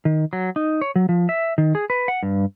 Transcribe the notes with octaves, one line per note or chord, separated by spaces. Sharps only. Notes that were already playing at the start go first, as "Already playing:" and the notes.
D#3
F#3
D#4
C#5
F#3
F3
E5
D#3
G#4
B4
F#5
G2